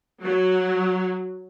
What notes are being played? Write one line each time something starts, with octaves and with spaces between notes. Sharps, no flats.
F#3